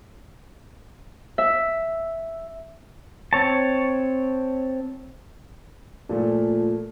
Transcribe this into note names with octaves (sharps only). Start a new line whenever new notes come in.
E5
C4 C#5 A5
A#2 F3 A3